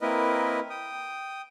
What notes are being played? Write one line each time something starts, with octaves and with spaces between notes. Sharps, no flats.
A#3 C4 E4 A#4 B4 D#5
G5 D#6